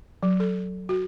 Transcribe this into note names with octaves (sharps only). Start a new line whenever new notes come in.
F#3
A4
F#4